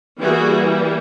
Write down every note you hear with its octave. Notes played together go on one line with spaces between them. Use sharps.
E3 G3 A#3 F#4 G#4